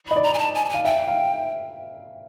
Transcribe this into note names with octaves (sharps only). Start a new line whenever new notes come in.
D#5 B5
D5
A#5
G#5
A5
G#5
A5
F5 G#5
E5 G5
F5